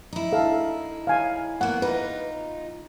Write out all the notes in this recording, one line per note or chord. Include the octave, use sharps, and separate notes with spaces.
D#4 E4
A4 F5
F5 G#5
A#3 B3 F#5
D#4 F4 B4